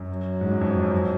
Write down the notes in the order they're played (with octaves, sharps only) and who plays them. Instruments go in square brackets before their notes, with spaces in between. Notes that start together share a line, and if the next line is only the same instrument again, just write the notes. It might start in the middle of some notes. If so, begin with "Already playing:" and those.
Already playing: [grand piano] F#2
[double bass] F#3
[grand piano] G#2
F#2
F2
F#2
F2